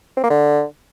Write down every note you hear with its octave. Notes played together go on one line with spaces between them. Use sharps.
C4
A#3
D3